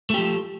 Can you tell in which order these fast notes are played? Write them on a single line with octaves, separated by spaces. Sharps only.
A3 G4 F3